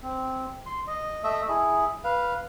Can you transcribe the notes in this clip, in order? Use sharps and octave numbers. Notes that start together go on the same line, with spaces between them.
C4
C6
D#5
A3 D#5 E5
E4 G#4
B4 F5